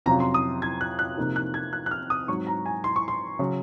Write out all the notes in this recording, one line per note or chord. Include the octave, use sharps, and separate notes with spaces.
F2 C3 F#3 C#4 F4 A#5
C6
D#6
G#6
F#6
F#6
C3 F3 A#3 D#4
F#6
G#6
F#6
F#6
F6
D#6
G#2 F#3 C4 C#6
A#5
G#5
C6
C#6
C6
C#3 F#3